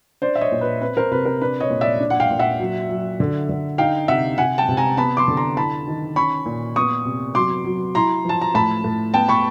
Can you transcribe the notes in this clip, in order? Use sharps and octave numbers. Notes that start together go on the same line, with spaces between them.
D4 C5 D5
E5
C#5 D#5
A#2
B4
C4 B4
A#4 C5
C3 B4
A#4
D4 B4
C#5 D#5
A#2
D5 E5
D4
F#5
F5 G5
A#2
E5 F#5
F#3
F#3
D3
D3
D#4 F5 G5
C3 E5 F#5
C3 F#5 G#5
G5 A5
C3
G#5 A#5
B3 A5 B5
C6 D6
D3
A#5 C6
E4 A5 B5
D#3
C#4 B5 C#6
A#2
B3 C#6 D#6
C3
F#3 C6 D6
F#3
E4 A#5 C6
F3 A5
A#5
A2 A5 B5
A2
B3 G5 A5
B5 C#6